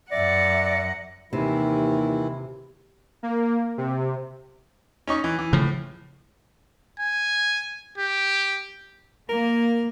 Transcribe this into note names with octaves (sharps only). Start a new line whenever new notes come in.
F#2 D5 E5 F#5 A#6
D#2 C3 D#3 E3 E4
A#3
C3
C#4 D#4 C#6
E3
E3
A2 C#3 F3
G#5
G4
A#3 A#4